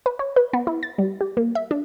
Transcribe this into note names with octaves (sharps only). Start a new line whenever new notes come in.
B4
C#5
B4
B3
E4
A6
G3
G4
A#3
E5
D4